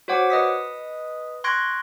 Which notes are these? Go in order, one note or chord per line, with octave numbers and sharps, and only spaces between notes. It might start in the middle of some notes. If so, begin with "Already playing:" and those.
F#4 C5 C#5 F#5 D6
B4 D#5 D#6 B6
C6 C#6 F#6 G#6 A#6 D7